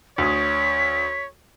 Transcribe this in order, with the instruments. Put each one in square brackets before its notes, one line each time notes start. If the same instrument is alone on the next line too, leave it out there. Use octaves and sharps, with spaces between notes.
[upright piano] D2 D#6 [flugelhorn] C#5 [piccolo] B6